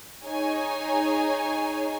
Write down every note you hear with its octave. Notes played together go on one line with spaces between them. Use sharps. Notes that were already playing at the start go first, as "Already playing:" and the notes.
D#4 G#4 C#5 G#5